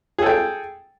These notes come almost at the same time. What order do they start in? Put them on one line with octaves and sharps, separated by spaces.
G#4 A4 G5